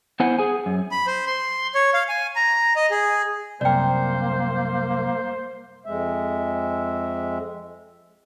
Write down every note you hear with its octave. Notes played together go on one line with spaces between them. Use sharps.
B3 E4 C5 F#5 G#5
G#4 G#5
F#2
B5
C5
C6
C#5
F5
G#5
A#5
D#5
G#4
C2 F#2 A#3 A#4 C5 D5 G5
F2 G#3 E5